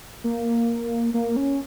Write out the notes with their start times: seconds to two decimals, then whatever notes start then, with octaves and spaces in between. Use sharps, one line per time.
0.24 A#3
1.14 A#3
1.36 C#4